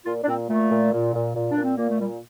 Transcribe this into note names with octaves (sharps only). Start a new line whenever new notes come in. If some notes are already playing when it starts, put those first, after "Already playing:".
A#2 F4
D4
A#2 C4
A#2 A3
A#2
A#2
A#2
A#2
D4
A#2
C4
A#2 A#3
A3
A#2 G3